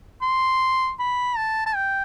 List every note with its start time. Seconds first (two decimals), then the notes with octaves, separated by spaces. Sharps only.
0.22 C6
0.99 B5
1.37 A5
1.66 A5
1.75 G5